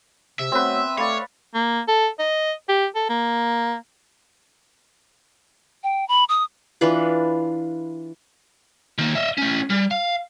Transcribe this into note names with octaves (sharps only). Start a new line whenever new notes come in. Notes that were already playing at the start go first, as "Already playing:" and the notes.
C3 E5
F#3 A3 B3 C4 B4
A3 C#5 D5 F5 B5
A#3
A4
D#5
G4
A4
A#3
G5
B5
D#6
E3 D4 F4 B4
D#3 A#3
D#5 E5
A3 C#4
G3
F5